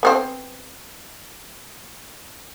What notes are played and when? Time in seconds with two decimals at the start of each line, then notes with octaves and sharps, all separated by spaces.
0.03 B3 C4 C5